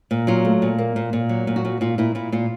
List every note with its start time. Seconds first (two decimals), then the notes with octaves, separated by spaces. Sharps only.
0.11 A#2
0.27 F#3 F4
0.45 A3
0.62 A#2
0.78 A#3
0.96 A#2
1.13 A#2
1.29 F#3
1.47 A#2
1.56 F#4
1.65 A#2
1.81 A#2 F4
1.98 A#2 E4
2.15 A#2 E4
2.32 A#2 F4